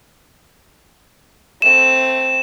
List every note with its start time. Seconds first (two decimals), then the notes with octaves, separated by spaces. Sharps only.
1.62 A3 C4 E7